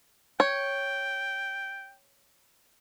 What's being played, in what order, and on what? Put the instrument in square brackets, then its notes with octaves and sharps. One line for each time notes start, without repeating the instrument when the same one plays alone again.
[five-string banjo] C#5 [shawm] G5